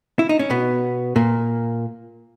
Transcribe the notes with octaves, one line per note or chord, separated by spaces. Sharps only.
E4
D#4
C#4
B2 B3
A#2 A#3